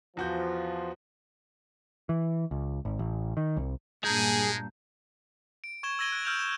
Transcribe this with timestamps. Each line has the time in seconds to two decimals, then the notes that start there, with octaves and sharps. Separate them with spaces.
0.17 E2 F3 F#4 G6
2.09 E3
2.51 C#2
2.85 G#1
2.99 A1
3.37 D#3
3.57 C2
4.04 G2 A#2 G#3 G#4 A5 A#5 G6
5.64 D7
5.83 C#6 G#6 E7 G7
5.99 E6 G#6 A#6 D#7 G7
6.12 F#6 D7
6.25 E6 F6 G6 D7 F7
6.39 E7